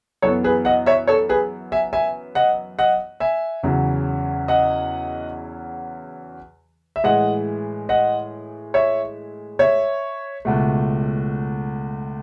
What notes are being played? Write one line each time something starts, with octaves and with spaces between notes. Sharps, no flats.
F#2 E3 B3 A4 C#5
G#4 B4
D#5 F#5
C#5 E5
A4 C#5
G#4 B4
E5 G#5
E5 G#5
D#5 F#5
D#5 F#5
E5 G#5
E2 C#3 F#3
D#5 F#5
E5
A2 E3 G#3 D#5 F#5
D#5 F#5
C#5 E5
C#5 E5
C#2 B2 A3